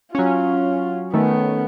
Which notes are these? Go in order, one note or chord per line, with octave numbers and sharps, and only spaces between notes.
F#3 C#4 F4
D#3 A3 B3 C#4